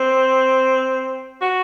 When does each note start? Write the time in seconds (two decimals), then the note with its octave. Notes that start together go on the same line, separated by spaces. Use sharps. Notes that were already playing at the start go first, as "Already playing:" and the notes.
Already playing: C4
1.42 F#4